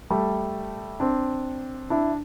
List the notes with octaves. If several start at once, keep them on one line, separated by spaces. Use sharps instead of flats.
G3 A3
C4 D4
D4 E4